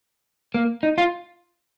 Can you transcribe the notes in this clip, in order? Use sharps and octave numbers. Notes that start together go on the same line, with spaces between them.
A#3
D#4
F4